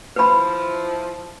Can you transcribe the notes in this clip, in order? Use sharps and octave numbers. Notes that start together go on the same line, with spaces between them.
F3 E4 B4 B5